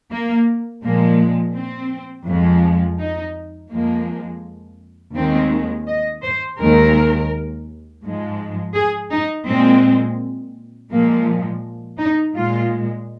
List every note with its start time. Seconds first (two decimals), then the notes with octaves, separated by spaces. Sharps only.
0.11 A#3
0.83 A#2 F3 G#3 A#3
1.55 C4
2.27 F2 F3 G#3
2.98 D#4
3.71 F2 F3 G#3 A#3
5.15 D#2 D#3 G#3 C4
5.87 D#5
6.23 C5
6.59 D#2 D#3 G#3 A#4
8.03 G#2 F3 G#3
8.75 G#4
9.11 D#4
9.47 A#2 G#3 C4
10.91 A#2 F3 G#3 A#3
11.99 D#4
12.35 A#2 G#3 F4